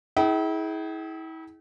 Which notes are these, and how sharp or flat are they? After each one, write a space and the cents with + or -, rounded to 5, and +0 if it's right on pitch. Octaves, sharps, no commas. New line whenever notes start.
E4 -35 G#4 +20 G5 -35